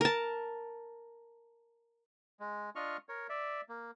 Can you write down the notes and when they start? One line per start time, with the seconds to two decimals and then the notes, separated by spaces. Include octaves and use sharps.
0.01 A#4 A5
2.40 G#3
2.76 D4 F4 D#5 C#6 F6
3.09 A#4 C#5
3.29 D5 E5
3.69 A#3